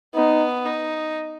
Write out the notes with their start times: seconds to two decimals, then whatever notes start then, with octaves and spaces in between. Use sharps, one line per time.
0.15 B3 D#4
0.65 D#4